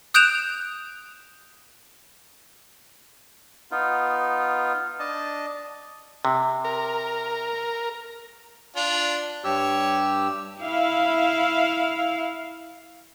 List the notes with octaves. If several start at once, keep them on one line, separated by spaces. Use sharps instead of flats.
D#6 F#6 G6 D7 E7 F7
B3 D#4 F4
D4 D#5 A5
C3
A#4
D4 F4
G2 G4 C#5 E6
E4 F5